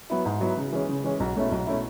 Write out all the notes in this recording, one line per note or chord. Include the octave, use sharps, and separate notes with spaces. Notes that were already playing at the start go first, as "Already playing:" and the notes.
F#3 B3 E4
G#2
F#3 B3 E4
C#3
E3 G#3 C#4
C#3
E3 G#3 C#4
B1
B2 A3 C#4 E4
B1
B2 A3 C#4 E4